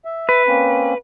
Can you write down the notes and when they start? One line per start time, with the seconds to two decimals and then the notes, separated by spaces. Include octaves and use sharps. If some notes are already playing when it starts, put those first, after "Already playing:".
0.05 E5
0.29 B4
0.48 A#3 C4 C#4